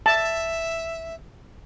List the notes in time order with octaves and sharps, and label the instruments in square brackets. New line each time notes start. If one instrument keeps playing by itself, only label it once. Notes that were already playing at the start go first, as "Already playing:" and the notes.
[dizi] E5 [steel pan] A5